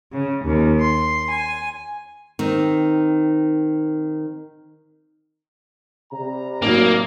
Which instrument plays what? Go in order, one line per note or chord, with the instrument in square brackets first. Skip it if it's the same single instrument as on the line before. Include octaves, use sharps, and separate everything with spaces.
[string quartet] C#3
D#2
C6
G#5
[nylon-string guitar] D#3 C4
[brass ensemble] C3 G3 A#5
[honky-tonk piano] A1 F#3 [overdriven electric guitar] A#3